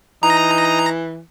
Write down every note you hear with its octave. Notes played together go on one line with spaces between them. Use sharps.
E3 D#4 A#5